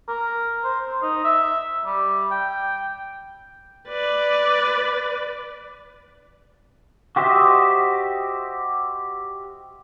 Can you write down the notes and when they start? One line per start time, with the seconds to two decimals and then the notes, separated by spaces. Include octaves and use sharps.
0.08 A#4
0.64 C5
0.87 C5
1.02 D#4
1.24 E5
1.85 G3
2.31 G5
3.89 B4 D5
7.16 F#4 G4 C5 D#5 E5